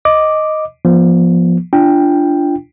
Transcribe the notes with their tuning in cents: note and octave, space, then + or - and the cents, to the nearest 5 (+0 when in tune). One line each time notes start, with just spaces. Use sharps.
D#5 +0 D6 +0
F3 +0 B3 -35
D4 -10 F4 -30 G5 +5